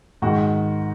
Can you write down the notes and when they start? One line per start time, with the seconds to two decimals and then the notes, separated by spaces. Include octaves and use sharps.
0.22 G#2 D#3 G#3 F#4